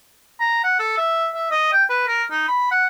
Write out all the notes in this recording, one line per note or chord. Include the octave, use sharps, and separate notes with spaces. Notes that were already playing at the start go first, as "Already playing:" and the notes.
A#5
F#5
A4
E5
E5
D#5
G5
B4
A#4
D#4
B5
F#5